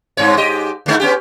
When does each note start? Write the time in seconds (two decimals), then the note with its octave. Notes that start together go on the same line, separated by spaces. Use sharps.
0.17 G2 C4 C#5
0.37 G#2 G4 D#5
0.86 D#2 G#3 D#4
1.00 B3 C#4 G4